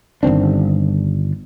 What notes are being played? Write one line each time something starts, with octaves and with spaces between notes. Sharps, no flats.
G1 D#3 C4 D4